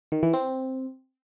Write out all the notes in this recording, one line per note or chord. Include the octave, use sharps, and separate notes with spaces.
D#3
E3
C4